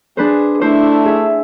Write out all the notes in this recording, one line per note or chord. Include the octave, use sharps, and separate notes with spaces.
D4 G#4 B4 C5
A3 D4 E4 C5
G#4 E5